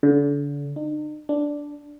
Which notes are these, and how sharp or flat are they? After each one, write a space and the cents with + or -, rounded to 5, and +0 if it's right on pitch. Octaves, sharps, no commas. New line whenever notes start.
D3 -35
D#4 -45
D4 -5